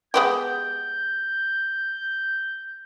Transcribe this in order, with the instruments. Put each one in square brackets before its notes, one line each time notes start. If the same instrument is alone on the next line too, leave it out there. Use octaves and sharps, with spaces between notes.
[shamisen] G#3 B3 G4 [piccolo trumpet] G6